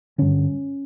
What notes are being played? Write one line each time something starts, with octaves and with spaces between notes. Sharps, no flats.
G2 D3 C#4